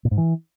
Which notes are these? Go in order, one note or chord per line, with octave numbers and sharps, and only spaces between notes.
A#2
G#2
E3